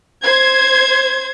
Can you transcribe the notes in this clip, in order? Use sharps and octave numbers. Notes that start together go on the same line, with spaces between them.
C5 G#6